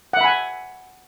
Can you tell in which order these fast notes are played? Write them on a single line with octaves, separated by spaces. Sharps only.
F#5 E5 B5 G#5